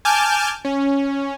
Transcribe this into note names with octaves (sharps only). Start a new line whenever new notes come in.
G#5 A5 D6 F6 G6
C#4